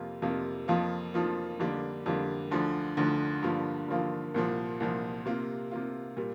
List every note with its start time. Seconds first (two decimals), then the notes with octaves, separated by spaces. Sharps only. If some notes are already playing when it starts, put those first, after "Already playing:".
Already playing: F2 C3 A#3 F4
0.22 F2 C3 A#3 F4
0.68 F2 F3 A#3 F4
1.14 F2 F3 A#3 F4
1.60 F2 D3 G3 A#3 D4
2.06 F2 D3 G3 A#3 D4
2.51 D2 D3 F3
2.97 D2 D3 F3
3.43 G2 D3 F3 A#3 F4
3.88 G2 D3 F3 A#3 F4
4.34 C2 A#2 F3
4.80 C2 A#2 F3
5.26 C3 A#3 F4
5.71 C3 A#3 F4
6.17 A#2 G3